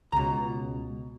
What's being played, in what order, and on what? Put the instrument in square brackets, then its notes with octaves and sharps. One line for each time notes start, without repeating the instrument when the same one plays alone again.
[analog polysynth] C#2 [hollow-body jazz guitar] B2 A#5